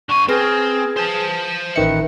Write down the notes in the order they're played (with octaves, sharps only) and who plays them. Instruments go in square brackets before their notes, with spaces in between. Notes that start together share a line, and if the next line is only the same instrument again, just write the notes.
[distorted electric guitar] D3 G#5 [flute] C#6
[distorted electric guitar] C4 [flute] G#4 [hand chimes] B4 F6 A#6
[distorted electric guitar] C5 A5
[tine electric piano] A1 D#3 C#7 [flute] B4 [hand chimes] E5